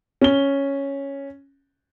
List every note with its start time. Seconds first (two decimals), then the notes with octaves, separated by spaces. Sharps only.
0.21 C#4 G7